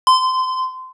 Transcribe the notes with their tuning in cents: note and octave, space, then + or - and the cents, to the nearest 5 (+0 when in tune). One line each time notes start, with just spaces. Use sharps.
C6 -25